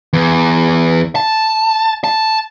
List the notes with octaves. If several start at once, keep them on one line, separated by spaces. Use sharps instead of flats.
E2
A5
A5